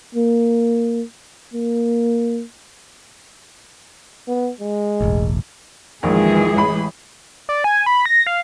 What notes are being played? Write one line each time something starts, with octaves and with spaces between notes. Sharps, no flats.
A#3
A#3
B3
G#3
E1 A1
A#1 F2 D#3 E3 G#3 G#4
A1 B5
D5
G#5
B5
A#6
F5